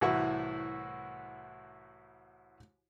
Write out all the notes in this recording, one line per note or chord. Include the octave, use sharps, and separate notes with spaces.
C2 A2 E3 E4 F#4 C#6